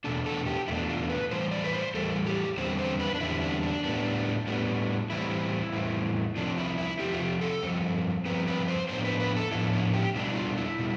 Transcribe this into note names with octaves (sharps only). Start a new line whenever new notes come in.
E2 B2 A3 D4 A4
A4
G4
E2 B2 A3 D4 E4
F4
B4
A2 E3 G3 C5
D5
B4
C5
A2 E3 G3 A4
G4
E2 D3 G3 C4 C5
C5
B4
D4
E2 D3 G3 C4 E4
D4
D4
A2 G3 B3 D4
A2 G3 B3 D4
A2 E3 G3 C4 E4
A2 E3 G3 C4
C3 F3 C4 D4
E4
E4
C3 F3 C4 G4
F4
G4
A4
G2 F3 C4
G2 F3 C4 B4
B4
C5
A2 F3 B3 D4 C5
B4
B4
A4
A2 F3 B3 D4 E4
E4
G4
B2 G3 D4 E4
F4
E4
B2 G3